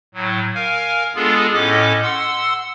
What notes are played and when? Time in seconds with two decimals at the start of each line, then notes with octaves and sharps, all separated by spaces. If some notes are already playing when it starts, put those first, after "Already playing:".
0.14 A2 F#3
0.55 A#4 F5 G#5
1.15 G#3 B3 D4 F4 G#4 A4
1.54 A2 C#4 A4 D#5 D6
2.03 F#5 C6 E6